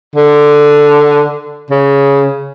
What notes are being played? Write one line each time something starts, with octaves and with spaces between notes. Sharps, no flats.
D3
C#3